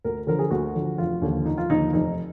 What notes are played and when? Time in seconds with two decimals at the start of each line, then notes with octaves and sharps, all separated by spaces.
0.04 D2 A#4
0.27 D3 F3 A#4
0.39 G#4
0.51 D2 F#4
0.75 D3 F3
0.98 F1 F4
1.22 D#2 D3 F3
1.45 F1 D#4
1.58 F4
1.70 D#2 D3 F3 D#4
1.93 F1 D#4